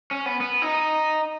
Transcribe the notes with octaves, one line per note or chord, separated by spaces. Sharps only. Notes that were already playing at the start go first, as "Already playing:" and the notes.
C#4
B3
B3
D#4